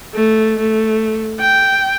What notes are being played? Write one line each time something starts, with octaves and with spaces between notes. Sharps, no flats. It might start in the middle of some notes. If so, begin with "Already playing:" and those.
A3
A3
G5